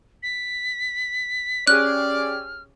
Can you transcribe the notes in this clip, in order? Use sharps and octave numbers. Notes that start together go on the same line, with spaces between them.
B6
C#4 G4 G#4 D5 F6 F#6